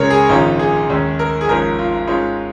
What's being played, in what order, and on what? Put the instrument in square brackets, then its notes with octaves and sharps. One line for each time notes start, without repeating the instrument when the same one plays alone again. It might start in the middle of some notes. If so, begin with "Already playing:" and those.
Already playing: [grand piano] C#2 C#3 G#3 C#4 A#4 C#5
G#4
A#1 G#2 D#3 C#4 F4
G#4
D#2 D#3 G#3 C#4
A#4
G#4
G#1 G#2 F3 G#3 C#4 A#4
F4
G#2 G#3 C#4 F4